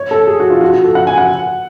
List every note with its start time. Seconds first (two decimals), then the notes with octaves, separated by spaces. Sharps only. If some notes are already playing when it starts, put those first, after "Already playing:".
Already playing: C#5
0.11 A4
0.27 G#4
0.40 F#4
0.50 F4
0.61 F#4
0.72 F#4
0.84 A4
0.95 F#5
1.07 G#5
1.18 F#5